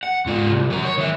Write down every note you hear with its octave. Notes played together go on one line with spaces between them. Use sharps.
F#5
G#2 F4
C2
F#3 A#4
C#5
D#3 E5